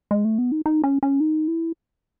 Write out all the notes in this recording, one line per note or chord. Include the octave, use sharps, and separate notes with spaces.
G#3
A3
B3
D#4
D#4
C#4
C#4
D#4
E4